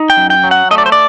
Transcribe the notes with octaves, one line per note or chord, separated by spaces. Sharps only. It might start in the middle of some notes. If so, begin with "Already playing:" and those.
Already playing: D#4
G5
F#2
G5
F#3
F#5
A3 D#5
D5
C5
D5